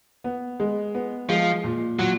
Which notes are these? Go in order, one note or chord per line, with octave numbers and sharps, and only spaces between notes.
B3
G#3
B3
F3 G#3
A#2
A#2 F#3